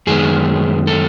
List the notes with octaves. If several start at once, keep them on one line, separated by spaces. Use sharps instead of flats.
F#2 D#3 G#3 B3 G#4
A4